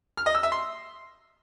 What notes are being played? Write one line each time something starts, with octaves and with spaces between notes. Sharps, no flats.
F6
D#5
E6
E5
C6